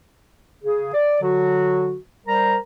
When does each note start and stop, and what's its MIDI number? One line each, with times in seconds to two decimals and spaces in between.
0.64 0.92 49
0.64 0.92 68
0.94 1.17 74
1.22 1.97 50
1.22 1.97 54
1.22 1.97 66
2.27 2.57 55
2.27 2.57 70
2.27 2.57 72
2.27 2.57 82